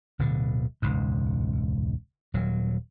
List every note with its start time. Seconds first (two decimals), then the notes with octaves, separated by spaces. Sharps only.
0.19 D1 B2 D3
0.82 E1 C#2 G#2
2.34 D#1 F#3